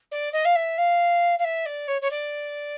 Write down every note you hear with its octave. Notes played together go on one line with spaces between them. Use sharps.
D5
D#5
F5
E5
F5
F5
E5
D5
C#5
C#5
D5